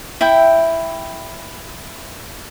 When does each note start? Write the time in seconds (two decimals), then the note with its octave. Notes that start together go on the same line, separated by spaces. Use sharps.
0.21 E4 E5 G5